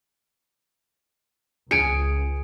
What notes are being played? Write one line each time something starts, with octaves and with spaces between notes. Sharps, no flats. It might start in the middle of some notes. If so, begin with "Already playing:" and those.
C#2 G#4 C#7 D7